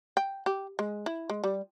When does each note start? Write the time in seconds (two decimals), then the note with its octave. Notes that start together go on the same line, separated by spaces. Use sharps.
0.17 G5
0.46 G4
0.79 G#3
1.06 E4
1.30 G#3
1.44 G3